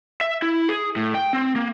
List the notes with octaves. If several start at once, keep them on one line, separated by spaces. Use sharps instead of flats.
E5
E4
G#4
A2
G5
C4
A#3